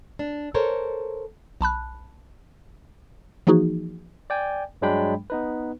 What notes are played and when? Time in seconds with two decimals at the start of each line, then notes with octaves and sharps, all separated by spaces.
0.19 D4
0.54 A4 A#4 C5 C#5
1.61 B1 A5 B5 F#6
3.47 E3 F3 A#3 D#4 F#4 G#4
4.30 D5 G5 G#5
4.82 G2 F#3 G#3 D4 G5 B5
5.30 B3 D#4 B4